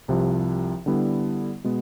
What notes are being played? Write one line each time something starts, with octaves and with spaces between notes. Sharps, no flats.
C2 C3 F3
D3 G3 B3 E4
B2 G#3 B3